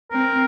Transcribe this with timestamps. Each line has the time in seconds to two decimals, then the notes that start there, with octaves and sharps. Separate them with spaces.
0.12 C4 A#4